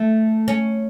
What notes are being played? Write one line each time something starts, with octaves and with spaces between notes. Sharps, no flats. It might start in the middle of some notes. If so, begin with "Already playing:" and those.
Already playing: A3
C#4